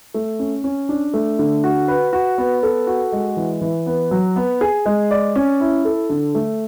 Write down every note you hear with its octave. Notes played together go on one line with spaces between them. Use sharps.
A3
C#4
C#4
D4
A3
D3
F#4
B4
F#4
B3
A4
F#4
G#3
E3
E3
B3
F#3
B3
G#4
G#3
D5
C#4
E4
A4
D3
A3